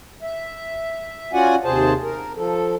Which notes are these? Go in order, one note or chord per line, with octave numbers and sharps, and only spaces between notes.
E5
C#4 F4 F#4 D5 F#5 G#5
D#2 C3 G#4 C5 A5
A#4
F3 A4